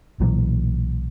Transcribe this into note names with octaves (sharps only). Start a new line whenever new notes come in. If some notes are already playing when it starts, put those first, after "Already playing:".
B1 A#2 E3 F#3